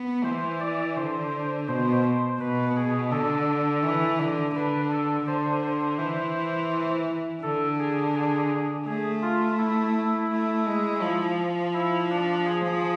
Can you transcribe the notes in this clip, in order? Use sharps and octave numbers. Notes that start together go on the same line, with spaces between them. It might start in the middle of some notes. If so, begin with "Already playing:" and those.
Already playing: B3
E3 C5
D5
D3 C5
B2 C5
C5
B2 B4
G#4
D3 A4
E3
D3
D3 B4
A4
D3 C5
C5
E3
D3 A4
G#4
G#4
A3 G#4
F4
E4
E4
A3
G#3
F3
E4
D4
G#4